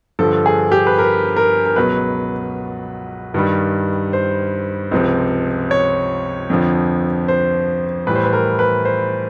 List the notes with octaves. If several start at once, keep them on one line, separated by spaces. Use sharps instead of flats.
G2 D3 F3 A4
G#4
G4
B4
A#4
A#4
A#4
C#2 B2 F#3 B4
G2 D#3 G3
C5
C#2 C3 F3
C#5
F2 D3 F3
C5
A2 E3 G3 B4
C5
B4
A#4
B4
C5